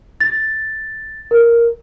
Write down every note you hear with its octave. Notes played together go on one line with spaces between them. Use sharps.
A6
A#4